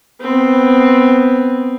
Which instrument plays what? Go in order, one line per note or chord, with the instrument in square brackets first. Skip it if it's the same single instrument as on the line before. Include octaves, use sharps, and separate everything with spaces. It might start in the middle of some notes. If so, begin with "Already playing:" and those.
[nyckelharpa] B3 C4